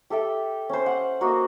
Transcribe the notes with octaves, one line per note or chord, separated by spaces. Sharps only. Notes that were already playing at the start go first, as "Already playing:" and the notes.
G4 A4 E5 G5
C#4 C5
F#5
A#3 F#4 D#5